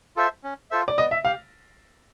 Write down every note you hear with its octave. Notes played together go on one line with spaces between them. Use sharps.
F4 A4 C5 E5
C#4
F4 A4 C5 E5
D5
B3 D#5
E5
G4 F5